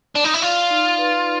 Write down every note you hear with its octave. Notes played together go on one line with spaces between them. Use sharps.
D4
D#4
E4
F4 D5
D#4
B4